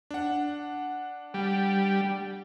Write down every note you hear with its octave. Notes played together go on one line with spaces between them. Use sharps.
D4 F#5
G3